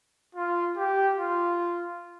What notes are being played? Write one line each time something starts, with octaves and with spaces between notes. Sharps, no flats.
F4
G4
F4